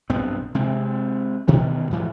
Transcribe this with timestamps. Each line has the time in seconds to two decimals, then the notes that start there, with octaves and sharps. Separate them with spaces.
0.10 B1 G2 B3 C4
0.55 C3 G#3 C4
1.48 G2 B2 D#3 E3
1.91 G#2 E3 F#3